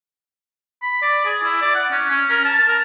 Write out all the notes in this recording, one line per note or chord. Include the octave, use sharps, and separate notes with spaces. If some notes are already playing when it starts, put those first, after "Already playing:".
B5
D5
G#4
E4
D5
F#5
C#4
C#4
A#4
A5
A#4